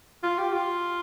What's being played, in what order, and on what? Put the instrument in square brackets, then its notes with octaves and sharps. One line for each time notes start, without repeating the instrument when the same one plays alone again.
[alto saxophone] F4
G4
F4